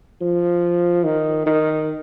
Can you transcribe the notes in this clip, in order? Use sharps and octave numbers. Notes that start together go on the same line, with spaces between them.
F3
D#3
D#3